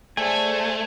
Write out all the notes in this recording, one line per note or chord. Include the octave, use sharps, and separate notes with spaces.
A3 G#4 C5 D5 G#5